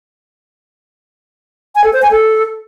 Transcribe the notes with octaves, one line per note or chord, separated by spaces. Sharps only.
G#5
A4
C5
G#5
A4